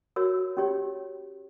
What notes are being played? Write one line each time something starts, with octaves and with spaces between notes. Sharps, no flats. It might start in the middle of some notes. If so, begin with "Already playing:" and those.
F#4 A#4 C#5 E6
C#4 G4 C#5